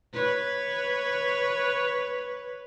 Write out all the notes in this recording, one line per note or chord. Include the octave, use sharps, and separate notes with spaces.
B4 C#5